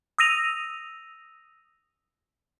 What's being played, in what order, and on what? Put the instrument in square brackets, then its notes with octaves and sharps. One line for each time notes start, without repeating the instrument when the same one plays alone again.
[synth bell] D#6 E6 A#6 D#7 F7